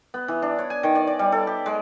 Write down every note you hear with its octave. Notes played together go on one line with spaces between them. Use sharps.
B3
E3
D4
C#5
G#5
D#3
D5
D5
G3
A4
G4
G#3